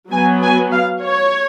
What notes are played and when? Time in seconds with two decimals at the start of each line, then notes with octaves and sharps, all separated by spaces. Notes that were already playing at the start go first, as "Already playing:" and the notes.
0.11 F#3 B3 G#5
0.42 G#5
0.71 F5
1.02 C#5